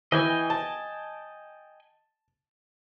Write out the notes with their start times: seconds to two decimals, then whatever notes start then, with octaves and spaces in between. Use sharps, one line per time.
0.12 E3 D#5 G5 G#5
0.50 A5